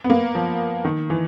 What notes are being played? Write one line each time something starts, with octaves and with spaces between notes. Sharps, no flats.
B3
A#3
F3
D#3
E3